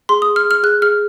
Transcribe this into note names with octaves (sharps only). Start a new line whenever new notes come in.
G#4 C6
D#6
G#4
F6
G#4
F6
G#4 F#6
G#4 F6